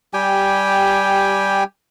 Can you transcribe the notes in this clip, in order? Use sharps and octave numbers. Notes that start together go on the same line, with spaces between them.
G3 G4 G5 G#5